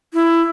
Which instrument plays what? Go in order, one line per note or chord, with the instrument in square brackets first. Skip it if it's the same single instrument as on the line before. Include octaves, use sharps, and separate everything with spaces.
[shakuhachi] E4